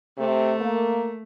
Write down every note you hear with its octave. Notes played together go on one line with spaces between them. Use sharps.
C3 A3
A#3